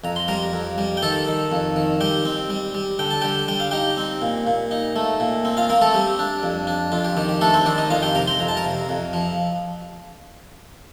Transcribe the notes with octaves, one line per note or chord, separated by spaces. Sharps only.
F2 A#5
C6
G3 A#4 A#5
F2
G3
G5
D#3 A4 A5
D#3
F2
D#3
G3 G4 G5
C4
G3
G3
D3 G5
A5
D3 G4 G5
G3 G5
F5
D#4 G4 G5
C4
A#2
A#2
D#4
A3
A#2
C4
F4 F5
A#3 C4 A#4
A3 A4
G3 G4
D4
F2
D4
F2 F4
G4
D#3 G4
G4
A3 D4 A4
C4 C5
D#3 D4 D5
D#4 D#5
F2 F4 F5
G4 G5
C3 A#4 A#5
C5 C6
F2 A#5
A5
A#4 A#5
C3
F2
F3